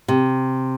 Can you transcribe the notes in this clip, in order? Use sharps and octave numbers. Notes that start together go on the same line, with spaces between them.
C3